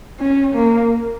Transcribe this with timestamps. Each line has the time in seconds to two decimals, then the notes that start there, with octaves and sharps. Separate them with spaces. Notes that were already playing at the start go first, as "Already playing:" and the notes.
0.19 C#4
0.55 A#3